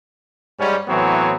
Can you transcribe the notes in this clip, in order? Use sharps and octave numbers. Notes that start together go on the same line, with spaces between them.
G#2 G3 C#4
A2 E3 F#3 B3 C4 C#5